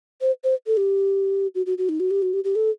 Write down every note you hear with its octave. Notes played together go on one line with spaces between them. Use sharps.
C5
C5
A4
G4
F#4
F#4
F#4
D#4
F#4
G4
F#4
G4
G4
A4